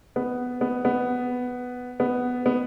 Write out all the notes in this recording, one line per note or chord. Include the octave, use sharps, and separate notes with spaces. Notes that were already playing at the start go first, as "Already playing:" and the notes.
B3
B3
B3
B3
B3